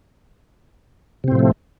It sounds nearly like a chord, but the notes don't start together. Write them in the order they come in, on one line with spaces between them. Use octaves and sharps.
C3 C4 A2 F3 A3